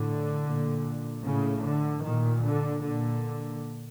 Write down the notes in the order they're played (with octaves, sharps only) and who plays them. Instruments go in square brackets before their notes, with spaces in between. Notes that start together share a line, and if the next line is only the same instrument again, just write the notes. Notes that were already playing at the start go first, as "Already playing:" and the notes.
Already playing: [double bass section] A2 D3
A#2
A2 C#3
D3
A#2 D#3
D3
A#2 D3